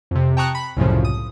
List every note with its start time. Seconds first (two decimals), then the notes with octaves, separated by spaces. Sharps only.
0.11 F2 C3
0.37 G5 A5 A#5 C#6 D#6 F#6
0.55 B5
0.77 C2 F#2 A2 C#3 F3
1.05 D#6